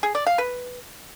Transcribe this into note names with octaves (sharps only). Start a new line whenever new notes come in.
G#4
D5
F5
B4